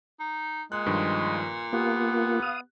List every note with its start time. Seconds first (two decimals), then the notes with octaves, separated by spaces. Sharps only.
0.20 D#4
0.72 A#2 G#3 F#6
0.86 G2 D#3 F3
1.73 A#3 B3 F4 G4
2.42 F5 D#6